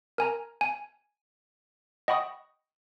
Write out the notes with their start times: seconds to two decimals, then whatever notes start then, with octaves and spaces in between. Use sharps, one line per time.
0.18 A#4 G#5 A#5
0.61 G#5
2.08 D#5 F#5 G5 B5 C#6 D#6